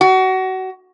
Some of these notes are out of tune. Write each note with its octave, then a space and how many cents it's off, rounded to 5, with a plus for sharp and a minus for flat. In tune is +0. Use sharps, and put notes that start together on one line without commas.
F#4 +25